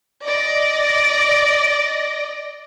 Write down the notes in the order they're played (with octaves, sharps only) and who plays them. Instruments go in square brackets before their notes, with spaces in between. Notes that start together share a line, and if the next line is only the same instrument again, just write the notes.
[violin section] D5 D#5 A#6